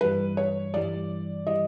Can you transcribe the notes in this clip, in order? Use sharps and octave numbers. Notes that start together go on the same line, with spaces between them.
G2 E3 G3 B4
C#5
G2 E3 G3 D5
E3 G3 D#5